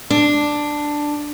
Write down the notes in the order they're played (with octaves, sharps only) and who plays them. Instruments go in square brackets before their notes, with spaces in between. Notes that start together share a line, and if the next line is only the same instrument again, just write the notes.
[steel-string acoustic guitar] D4